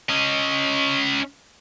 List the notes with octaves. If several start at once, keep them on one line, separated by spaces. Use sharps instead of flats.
C#4 D#5